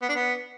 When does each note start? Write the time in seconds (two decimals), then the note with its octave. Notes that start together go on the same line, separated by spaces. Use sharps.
0.02 B3
0.09 D4
0.16 B3